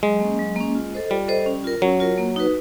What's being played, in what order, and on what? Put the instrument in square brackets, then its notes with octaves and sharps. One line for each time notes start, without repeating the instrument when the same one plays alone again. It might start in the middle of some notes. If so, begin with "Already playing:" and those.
[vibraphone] F#3 [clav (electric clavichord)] G#3
[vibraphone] A#3 C#4
F#3
A#3 C#4
F4
A4 C5 D#5
[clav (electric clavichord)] G3 [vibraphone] F4
[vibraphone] A4 C5 D#5
C#4
F4 A#4
[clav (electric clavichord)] F#3 [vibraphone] C#4
[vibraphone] F4 A#4
A#3
D#4 F#4 B4